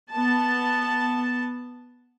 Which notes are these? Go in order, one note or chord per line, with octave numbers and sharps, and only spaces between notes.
B3 A5